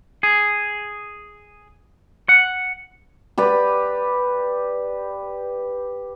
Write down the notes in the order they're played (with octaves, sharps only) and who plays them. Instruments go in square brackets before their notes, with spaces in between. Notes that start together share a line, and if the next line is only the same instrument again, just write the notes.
[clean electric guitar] G#4
F#5
[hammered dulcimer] G4 B4 D5